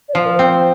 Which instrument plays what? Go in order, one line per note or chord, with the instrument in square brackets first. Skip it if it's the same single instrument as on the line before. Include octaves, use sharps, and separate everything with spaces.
[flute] D5
[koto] F3 [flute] C5
[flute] A#4
C5
[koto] C4